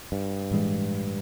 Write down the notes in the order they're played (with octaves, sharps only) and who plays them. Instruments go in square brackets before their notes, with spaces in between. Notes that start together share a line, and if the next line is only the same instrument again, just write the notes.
[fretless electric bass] G2
[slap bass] A2 E3 G#3